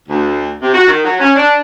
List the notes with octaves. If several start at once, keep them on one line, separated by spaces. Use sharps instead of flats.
D2
C3
F#4
D#3
F#3
C#4
D4